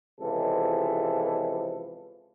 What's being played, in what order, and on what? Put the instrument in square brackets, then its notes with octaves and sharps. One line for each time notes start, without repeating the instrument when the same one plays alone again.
[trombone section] C#2 C3 E3 F3 G#3 A4